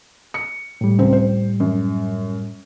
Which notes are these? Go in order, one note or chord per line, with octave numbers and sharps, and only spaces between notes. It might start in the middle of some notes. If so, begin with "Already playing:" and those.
C#7
A2 G3
C#2 C4
C5
F#2